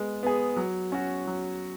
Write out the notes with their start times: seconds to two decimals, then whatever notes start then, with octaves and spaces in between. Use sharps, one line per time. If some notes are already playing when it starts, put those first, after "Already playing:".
Already playing: G#3 B3
0.23 B3 G#4
0.57 F#3
0.92 C#4 F#4
1.27 F#3